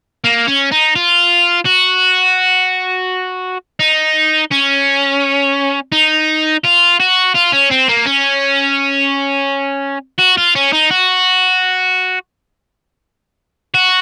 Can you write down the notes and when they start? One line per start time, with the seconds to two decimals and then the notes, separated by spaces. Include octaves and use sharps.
0.24 A#3
0.47 C#4
0.71 D#4
0.96 F4
1.65 F#4
3.80 D#4
4.51 C#4
5.92 D#4
6.64 F4
7.00 F#4
7.34 F4
7.52 C#4
7.70 C4
7.88 A#3
8.05 C#4
10.19 F#4
10.37 F4
10.55 C#4
10.73 D#4
10.91 F#4
13.74 F#4